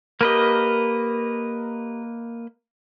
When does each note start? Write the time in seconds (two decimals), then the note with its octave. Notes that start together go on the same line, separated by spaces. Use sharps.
0.21 A#3 G4 A#4 B4 D#5